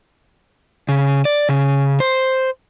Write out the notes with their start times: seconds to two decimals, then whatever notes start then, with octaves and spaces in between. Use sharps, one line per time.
0.89 C#3
1.25 D5
1.49 C#3
2.00 C5